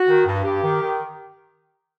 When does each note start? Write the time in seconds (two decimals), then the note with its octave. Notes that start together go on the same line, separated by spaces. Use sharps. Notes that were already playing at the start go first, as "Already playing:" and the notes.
Already playing: F#4
0.08 D#3
0.26 G2
0.44 G2 G4
0.62 D#3
0.81 D#3